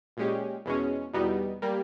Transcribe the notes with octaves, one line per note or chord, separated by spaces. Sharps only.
A#2 G#3 C#4 G4
E2 B2 G#3 C#4
E2 B2 G3 B3 D#4
G3 A#3